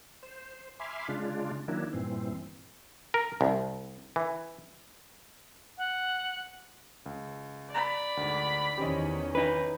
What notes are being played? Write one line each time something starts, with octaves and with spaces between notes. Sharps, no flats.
C5
E5 G#5 B5 C6 D6 F6
C#3 G#3 D4 F4
D#3 F#3 A#3 D4 E4
G2 A#2 E3 C4
A#4
C2
E3
F#5
C#2
D5 B5
D2 G#2
E2 D#3 C#4 G4 C5 D#5
D#4 B4